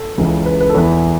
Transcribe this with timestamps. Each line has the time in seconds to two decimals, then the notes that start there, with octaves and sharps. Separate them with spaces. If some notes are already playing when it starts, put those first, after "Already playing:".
Already playing: A4
0.18 C#2 C#3 E3
0.46 B4
0.61 B4
0.69 A4
0.74 E2 E3 B4